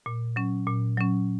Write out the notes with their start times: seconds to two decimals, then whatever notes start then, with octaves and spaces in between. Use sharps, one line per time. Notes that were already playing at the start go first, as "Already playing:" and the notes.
0.06 A#2
0.36 F#3 C#4
0.67 A#2
0.98 F#3 C#4